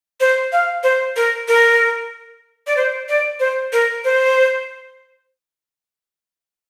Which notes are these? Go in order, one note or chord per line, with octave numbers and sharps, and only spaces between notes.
C5
F5
C5
A#4
A#4
D5
C5
D5
C5
A#4
C5